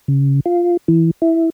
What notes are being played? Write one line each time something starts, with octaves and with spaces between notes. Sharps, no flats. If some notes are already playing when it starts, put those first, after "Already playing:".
C#3
F4
E3
E4